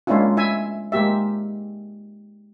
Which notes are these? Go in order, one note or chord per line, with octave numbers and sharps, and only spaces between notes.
G#3 A#3 C#4 D4 E4 F4
E4 E5 G#5
G#3 A#3 G4 E5